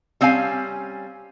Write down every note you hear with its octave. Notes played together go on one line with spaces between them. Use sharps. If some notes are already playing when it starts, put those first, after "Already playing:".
G3 C4 C#4 F5 G#5